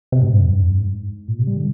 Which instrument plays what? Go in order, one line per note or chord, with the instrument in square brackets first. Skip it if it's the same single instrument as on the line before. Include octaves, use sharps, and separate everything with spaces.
[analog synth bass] C3
G#2
G2
F2
G2
F2
G2
G#2
A#2
C3
G3
D3